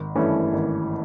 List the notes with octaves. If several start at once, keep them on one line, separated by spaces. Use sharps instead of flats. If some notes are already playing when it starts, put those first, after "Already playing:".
Already playing: G#1
G2 E3 A3 C#4
G#1